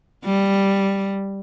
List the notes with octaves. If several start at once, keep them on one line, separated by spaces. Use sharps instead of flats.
G3